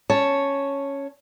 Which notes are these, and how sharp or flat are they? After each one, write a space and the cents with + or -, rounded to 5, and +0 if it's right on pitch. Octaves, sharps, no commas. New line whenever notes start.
C#4 +0 C#5 +0 A5 +0